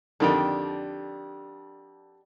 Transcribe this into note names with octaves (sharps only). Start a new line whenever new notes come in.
F2 D3 D#3 D4 G4